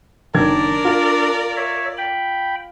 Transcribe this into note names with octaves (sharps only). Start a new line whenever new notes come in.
F#1 D#3 D4 A#4 D5 G#6
F4
C#5 E5
G5 B5